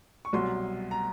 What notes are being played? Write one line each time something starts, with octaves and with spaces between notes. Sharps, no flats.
C#6
C2 B2 F#3 C6
A#5